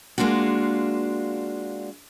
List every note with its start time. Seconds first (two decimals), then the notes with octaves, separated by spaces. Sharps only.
0.18 G#3 A#3 D4 F4 F#4